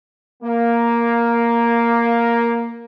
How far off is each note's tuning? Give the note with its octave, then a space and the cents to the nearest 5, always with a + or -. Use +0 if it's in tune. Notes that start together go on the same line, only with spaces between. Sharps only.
A#3 +5